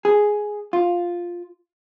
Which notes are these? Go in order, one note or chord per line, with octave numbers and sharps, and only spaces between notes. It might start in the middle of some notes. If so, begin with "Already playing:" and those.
G#4
F4